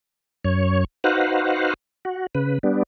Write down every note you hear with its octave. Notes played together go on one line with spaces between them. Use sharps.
F#2 C#5
D#4 F#4 B4 C5 F5 F#5
F#4
C#3 B4
G3 B3 D4